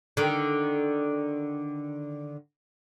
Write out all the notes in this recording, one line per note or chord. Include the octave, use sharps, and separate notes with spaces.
D3 D#3